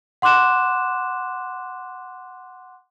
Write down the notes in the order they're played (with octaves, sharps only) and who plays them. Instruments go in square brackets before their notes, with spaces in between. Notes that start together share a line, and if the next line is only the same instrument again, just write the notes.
[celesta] F#5 C6 D6 F#6 E7